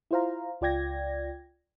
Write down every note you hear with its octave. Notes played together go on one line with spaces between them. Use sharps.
E4 F4 C5 F5 A#5
C#2 F4 D5 G5 G#6 A#6